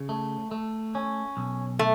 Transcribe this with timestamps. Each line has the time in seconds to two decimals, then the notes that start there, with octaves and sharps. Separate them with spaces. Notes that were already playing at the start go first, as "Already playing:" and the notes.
Already playing: C#3
0.09 A3
0.51 A3
0.95 C#4
1.37 B1
1.79 A3